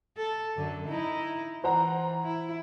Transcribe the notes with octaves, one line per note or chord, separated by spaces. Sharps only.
A4
F#2 D3
D#4 E4
E3 C5 F#5 A#5
E4